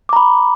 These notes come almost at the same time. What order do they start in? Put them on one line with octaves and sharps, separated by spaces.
D6 A#5 B5